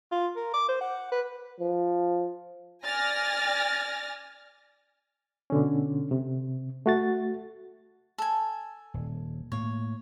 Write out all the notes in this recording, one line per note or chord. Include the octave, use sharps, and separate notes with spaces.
F4
A#4
D6
C5
F#5
B4
F3
D5 G#5 F6 A6 A#6
B2 D3 C#4
C3
A3 F#4 A6
A4 G#5
D#1
A2 A#3 C#5